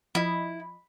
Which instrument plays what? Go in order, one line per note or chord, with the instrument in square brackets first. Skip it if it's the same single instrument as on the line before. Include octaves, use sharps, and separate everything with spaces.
[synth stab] F3 D#5 [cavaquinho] E4